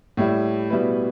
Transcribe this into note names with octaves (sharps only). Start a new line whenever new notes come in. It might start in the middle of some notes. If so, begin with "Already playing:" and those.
A2 G3 E4
B2 G3 E4 B4